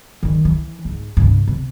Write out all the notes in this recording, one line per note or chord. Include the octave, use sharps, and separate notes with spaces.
D#3 G3
E3
G#2
G2 C3
C3